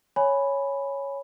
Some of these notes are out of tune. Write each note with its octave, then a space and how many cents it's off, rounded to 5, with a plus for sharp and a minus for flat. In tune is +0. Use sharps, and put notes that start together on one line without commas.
C#5 +0 G#5 +0 B5 +0